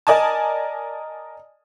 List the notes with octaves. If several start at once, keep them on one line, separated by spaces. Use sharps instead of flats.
A#4 D5 D#5 G#5 A5